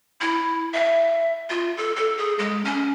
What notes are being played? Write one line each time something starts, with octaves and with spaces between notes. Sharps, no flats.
E4
E5
F4
A4
A4
G#4
G#3
C#4